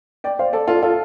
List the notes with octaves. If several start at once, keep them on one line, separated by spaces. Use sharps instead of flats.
D5 G5
C5 F5
A4 D5
F4 A4
F4 A4